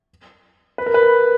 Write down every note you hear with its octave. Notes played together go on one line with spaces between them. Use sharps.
B4
A#4
B4
A#4